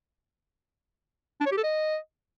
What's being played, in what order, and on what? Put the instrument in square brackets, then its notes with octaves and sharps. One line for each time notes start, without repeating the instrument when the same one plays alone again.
[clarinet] D4
C#5
G4
A4
D#5